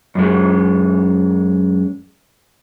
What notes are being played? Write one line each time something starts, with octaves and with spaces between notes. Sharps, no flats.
F#2 G#3